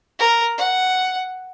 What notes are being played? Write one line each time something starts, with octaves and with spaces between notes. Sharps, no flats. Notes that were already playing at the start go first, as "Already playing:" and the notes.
A#4
F#5